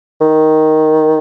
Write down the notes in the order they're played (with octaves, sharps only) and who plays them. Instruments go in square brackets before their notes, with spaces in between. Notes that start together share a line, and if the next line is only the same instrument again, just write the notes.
[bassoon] D#3